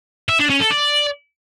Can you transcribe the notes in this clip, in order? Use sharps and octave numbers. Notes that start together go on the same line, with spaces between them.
E5
D4
C#4
A4
D5